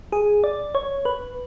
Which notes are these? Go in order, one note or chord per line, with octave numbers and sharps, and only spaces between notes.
G#4
D5
C#5
B4